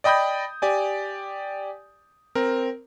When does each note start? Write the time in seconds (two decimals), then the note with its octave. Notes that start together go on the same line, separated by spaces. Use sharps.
0.04 D5 D#5 G5 B5 D#6 G6
0.62 G4 D5 G#5
2.35 C4 A#4